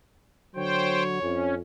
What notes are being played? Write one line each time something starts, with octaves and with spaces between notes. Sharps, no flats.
D3 F#3 C5 C#5 G5
F2 C#4